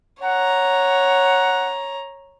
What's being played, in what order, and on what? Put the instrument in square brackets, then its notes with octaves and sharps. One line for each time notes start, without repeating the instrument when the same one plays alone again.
[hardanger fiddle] C#5 A#5 [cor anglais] F#5